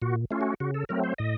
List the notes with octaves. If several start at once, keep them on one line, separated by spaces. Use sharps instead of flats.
A#2 F#4
A3 C#4 F4
F#4
C#3 F#4
A4
F#3 A3 C4 A#4
C5
A2 D#5